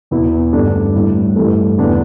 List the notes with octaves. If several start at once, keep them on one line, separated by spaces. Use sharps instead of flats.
E2 B2 B3 E4
G2 D3 A3 D4
A2 G3 E4
G2 E3 A3
E2 D3 B3 D4